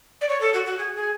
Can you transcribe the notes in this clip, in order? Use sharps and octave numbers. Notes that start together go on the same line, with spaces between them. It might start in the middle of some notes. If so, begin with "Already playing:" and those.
D5
C#5
A4
F#4
F#4
G#4
G#4